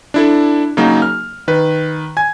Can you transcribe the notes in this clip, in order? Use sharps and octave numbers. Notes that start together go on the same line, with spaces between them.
D4 E4 A4
C#3 F#3 A#3 D#4
F6
D#3 B4
G#5 G#6